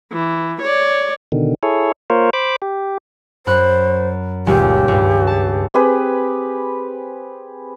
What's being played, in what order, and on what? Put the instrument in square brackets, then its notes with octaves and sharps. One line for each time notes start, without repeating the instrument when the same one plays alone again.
[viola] E3
C#5 D5
[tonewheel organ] B2 D3 D#3
E4 G#4 A4 C#5
A#3 F4 A#4 C5 C#5
C5 B5 D6
G4
[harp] F#2 B5 F#6 [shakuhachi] C5
[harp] D#1 C#2 [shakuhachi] G4
[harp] C#2 G2
A5
[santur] C4 G4 G#4 B4